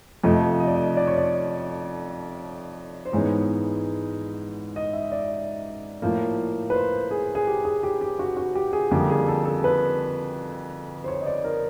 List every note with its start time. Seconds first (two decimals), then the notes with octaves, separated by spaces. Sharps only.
0.24 F2 C3 F3 A3 D#5
0.60 D#5
0.67 D5
0.75 D#5
0.97 D5
1.08 C#5
1.18 D5
3.05 C5
3.13 G#2 E3 G#3 B3 C#5
4.76 D#5
4.93 E5
5.12 D5
6.02 A2 F3 A#3
6.70 B4
6.74 C5
7.11 G#4
7.35 G#4
7.47 G4
7.65 G#4
7.83 G4
8.01 G4
8.19 F#4
8.37 F#4
8.55 G4
8.73 G#4
8.91 F2 D3 G3 A#3 G4
9.10 G#4
9.28 A4
9.45 A4
9.64 B4
11.04 C5
11.08 C#5
11.21 D#5
11.26 D5
11.44 A#4